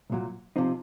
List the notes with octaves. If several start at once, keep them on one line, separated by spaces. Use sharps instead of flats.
C2 A#2 F#3
C3 F3 C4 D#4